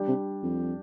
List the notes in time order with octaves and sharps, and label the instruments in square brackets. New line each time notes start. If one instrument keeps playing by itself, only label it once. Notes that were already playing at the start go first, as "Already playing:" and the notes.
Already playing: [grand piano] G3 D4 G4
[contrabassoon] C3
F2